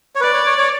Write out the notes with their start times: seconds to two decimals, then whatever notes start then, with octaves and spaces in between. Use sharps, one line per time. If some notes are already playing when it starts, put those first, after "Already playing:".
0.16 C#5
0.21 B4 D5
0.33 C#5
0.46 C#5
0.58 C#5